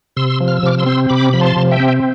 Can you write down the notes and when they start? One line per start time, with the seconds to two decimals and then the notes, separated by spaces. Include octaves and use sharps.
0.16 C3 C6 E6
0.40 F3
0.48 F6
0.57 E6
0.63 C3 D6 F6
0.78 C6 E6
0.86 C4
1.09 C3 B5 D6
1.33 F3 B5
1.40 A5 C6
1.56 C3
1.71 E5 G5
1.80 C4